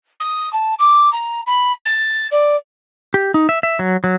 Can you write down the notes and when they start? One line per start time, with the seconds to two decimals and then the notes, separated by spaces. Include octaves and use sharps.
0.20 D#6
0.53 A5
0.79 D6
1.12 A#5
1.47 B5
1.85 A6
2.31 D5
3.14 G4
3.34 D#4
3.49 E5
3.63 E5
3.79 F#3
4.04 F#3